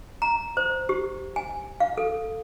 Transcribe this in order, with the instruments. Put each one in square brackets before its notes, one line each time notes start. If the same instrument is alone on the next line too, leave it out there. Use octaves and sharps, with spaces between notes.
[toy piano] A#5
C5
G4
G#5
F5
A4